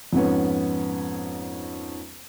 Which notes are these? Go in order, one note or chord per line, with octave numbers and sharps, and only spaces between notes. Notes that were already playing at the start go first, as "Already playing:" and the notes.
F2 G#2 B3 C#4